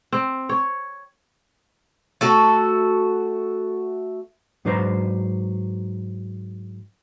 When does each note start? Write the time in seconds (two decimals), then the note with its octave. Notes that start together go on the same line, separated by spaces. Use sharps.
0.12 C4
0.49 C#5
2.21 A3 F#4 A4
4.65 G#2 F#3 D4 B4 C5 A#5